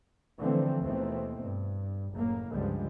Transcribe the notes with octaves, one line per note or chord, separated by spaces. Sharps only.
D3 E3 F3 A3 C4
D#2 B2 E3 A3 C4
G2
F#1 A2 C#3 A#3
C#2 G2 D3 F3 G3 G#3